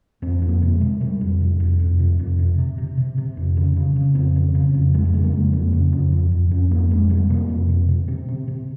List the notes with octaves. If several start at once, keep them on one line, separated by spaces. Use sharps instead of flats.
F2 C4
F2
A#3
C3
G#3
C3
C3 G3
F2
C3
F2
F2
C3
F2
C3
C3
C3
C3
C3
F2
C#3
C#3
C#3
F2 C4
C#3
C#3
F2
F2 G#3
G#3
C#3 G3
A#3
F2 G#3
F2 A#3
C#3
F2
F2
F2
F2 C#4
F2 A#3
F2 G#3
C3 G3
C3 A#3
F2
C3
C3
C3 C4
C3
C3